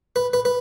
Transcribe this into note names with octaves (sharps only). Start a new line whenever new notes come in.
B4
B4
B4